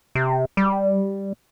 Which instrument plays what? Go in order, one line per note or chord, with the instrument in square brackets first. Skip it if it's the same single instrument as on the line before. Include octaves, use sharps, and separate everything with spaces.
[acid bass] C3
G3